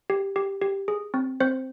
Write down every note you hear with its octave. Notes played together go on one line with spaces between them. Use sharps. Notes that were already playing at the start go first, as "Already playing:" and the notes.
G4
G4
G4
G#4
C4
C4 C5